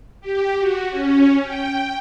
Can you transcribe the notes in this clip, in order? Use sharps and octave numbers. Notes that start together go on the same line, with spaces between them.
G4
F#4
C#4
G5